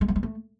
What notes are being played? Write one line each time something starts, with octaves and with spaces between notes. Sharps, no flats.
G#3
F#3
G#3
A3